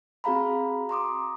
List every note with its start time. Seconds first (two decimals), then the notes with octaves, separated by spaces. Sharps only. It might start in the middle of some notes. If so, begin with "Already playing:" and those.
0.24 C4 F#4 G#4 F5 A#5 B5
0.89 A#5 C6 D6 D#6